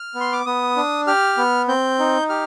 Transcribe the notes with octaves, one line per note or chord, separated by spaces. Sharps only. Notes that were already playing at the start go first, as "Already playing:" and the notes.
Already playing: F6
B3
C6
D6
B3 D#6
D4
G4 F6
B3
C4 G6
D#4
G4 F6